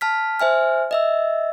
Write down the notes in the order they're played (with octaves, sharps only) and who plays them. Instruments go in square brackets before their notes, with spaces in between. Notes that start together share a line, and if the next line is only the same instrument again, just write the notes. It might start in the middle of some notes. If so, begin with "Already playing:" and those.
[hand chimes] A5 F6 B6
C5 E5 G#5 F6
D#5 E5 E6